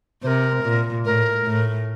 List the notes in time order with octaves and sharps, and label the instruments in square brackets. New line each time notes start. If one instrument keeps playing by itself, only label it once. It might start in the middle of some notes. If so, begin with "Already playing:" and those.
[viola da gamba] C3 [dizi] A#4 C5
[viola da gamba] A#2
[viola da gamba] A2 [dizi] A#4
[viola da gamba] A2